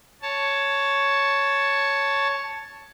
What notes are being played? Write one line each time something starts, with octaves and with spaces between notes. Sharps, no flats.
C#5 A5